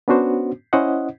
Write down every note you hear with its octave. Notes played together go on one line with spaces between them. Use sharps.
B3 C#4 D4 F#4 C5
C#4 E4 C5 D#5 F#5